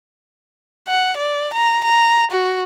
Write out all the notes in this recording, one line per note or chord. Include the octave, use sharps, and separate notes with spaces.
F#5
D5
A#5
A#5
F#4